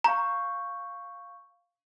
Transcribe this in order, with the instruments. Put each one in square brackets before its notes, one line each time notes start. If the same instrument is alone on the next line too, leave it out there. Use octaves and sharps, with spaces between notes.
[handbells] F5 C#6 G6 [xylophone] A#5